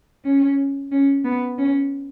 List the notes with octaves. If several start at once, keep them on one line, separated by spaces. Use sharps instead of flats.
C#4
C#4
B3
C#4